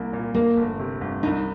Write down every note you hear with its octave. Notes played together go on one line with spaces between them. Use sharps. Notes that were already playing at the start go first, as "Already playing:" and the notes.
Already playing: C2 A#3
A#2
G1 A#3
G1
C3
G1
C2 D#4